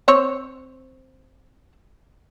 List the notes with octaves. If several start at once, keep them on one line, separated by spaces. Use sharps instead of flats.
C4 C5 C#5